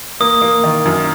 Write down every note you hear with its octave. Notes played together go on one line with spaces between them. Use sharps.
A#3 D#6
A#3
D#3
F#2